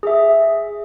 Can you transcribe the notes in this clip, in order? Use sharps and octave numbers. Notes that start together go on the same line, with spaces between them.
G#4 E5